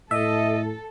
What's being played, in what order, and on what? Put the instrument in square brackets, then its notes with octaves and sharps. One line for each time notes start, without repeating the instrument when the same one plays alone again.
[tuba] A2 [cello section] A4 [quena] D#5 [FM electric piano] E5